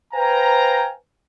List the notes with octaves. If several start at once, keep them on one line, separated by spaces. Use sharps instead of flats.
B4 C5 F5 G5 G#5 A#5